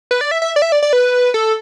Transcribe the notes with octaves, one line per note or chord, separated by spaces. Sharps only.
B4
D5
E5
E5
D5
E5
D5
D5
B4
A4